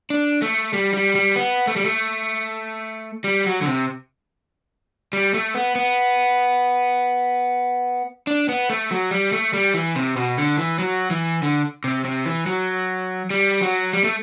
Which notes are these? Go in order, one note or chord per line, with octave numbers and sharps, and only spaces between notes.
D4
A3
G3
G3
G3
B3
A3
G3
A3
G3
F#3
D3
C3
G3
A3
B3
B3
D4
B3
A3
F#3
G3
A3
G3
E3
C3
B2
D3
E3
F#3
E3
D3
C3
C3
E3
F#3
G3
F#3
G3
A3